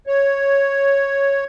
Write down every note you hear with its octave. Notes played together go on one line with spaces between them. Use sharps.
C#5